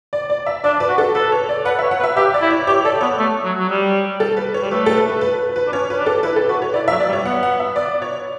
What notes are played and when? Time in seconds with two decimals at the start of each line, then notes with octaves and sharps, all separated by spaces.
0.13 D5
0.30 D5
0.46 E5
0.64 D4 D5
0.80 B4
0.89 F#4
0.98 A4
1.15 A4 B4
1.32 C#5
1.49 D5
1.65 B4 F#5
1.79 C#5 E5
1.91 F#5
2.00 B4
2.04 E5
2.16 G4 E5
2.34 D5
2.42 E4
2.50 C#5
2.67 G4 C#5
2.85 A4 D5
3.01 B3 C#5
3.18 A3
3.44 F#3
3.59 F#3
3.69 G3
4.20 A4
4.37 B4
4.54 C#5
4.62 G3
4.71 A3 B4
4.86 A4
4.96 B4
5.09 B4
5.21 B4
5.38 B4
5.56 B4
5.67 D4
5.72 C#4 C#5
5.90 B4
5.98 D4
6.06 A4
6.23 E4 B4
6.36 A4
6.49 F#4 B4
6.62 C#5
6.74 E4 D5
6.88 F#3 E5
7.00 D5
7.08 G3
7.13 C#5
7.25 B3 F#5
7.43 F#5
7.60 E5
7.76 D5
8.02 C#5